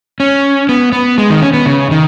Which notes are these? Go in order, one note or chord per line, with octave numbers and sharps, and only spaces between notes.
C#4
B3
B3
G#3
D#3
C#4
B3
C#3
D#3